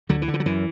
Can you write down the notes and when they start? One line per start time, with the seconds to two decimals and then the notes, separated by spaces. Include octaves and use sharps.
0.09 D2 D3 F#3
0.22 E3
0.28 D3
0.34 E3
0.40 F#3
0.46 F#2 E3